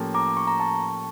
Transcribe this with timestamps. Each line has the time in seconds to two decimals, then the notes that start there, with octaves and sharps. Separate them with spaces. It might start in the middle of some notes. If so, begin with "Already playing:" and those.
Already playing: A2 F3 A#3 C#4 G4
0.14 A#5 D6
0.37 C#6
0.47 A#5
0.60 A5 C#6